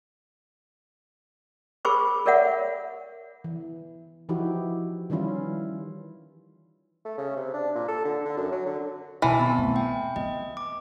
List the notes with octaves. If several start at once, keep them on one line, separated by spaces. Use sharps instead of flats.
G#4 A#4 C5 B5 C#6 D6
A4 A#4 C#5 D5 E5 F#5
E3
E3 F3 D#4 E4 F#4 G4
D#3 E3 G3 C#4 E4 F4
A3
C#3
C3
D4
A#2
A4
D3
D3
F#2
F#3
D3
B2 D#3 E3 A5
B3 C4 C6
A3
G5
B3 D#5
D6